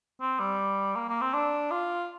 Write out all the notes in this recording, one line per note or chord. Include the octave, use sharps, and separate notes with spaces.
C4
G3
A#3
A#3
C4
D4
F4